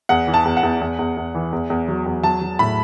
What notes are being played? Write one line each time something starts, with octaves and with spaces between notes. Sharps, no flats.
E2 F#5
E3
A5
E2
F#5
E2
E2
E2
E2
E3
E2
E2
F#3
E2
F#3 A5
F#3
A2 B5